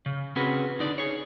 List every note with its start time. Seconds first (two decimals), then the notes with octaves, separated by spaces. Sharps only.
0.06 C#3
0.36 C4 C#4 F#4 G#4 B4
0.79 D3 D#4 D5
0.98 G#4 C#5